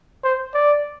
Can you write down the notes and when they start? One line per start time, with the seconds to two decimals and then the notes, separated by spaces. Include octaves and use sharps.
0.23 C5
0.54 D5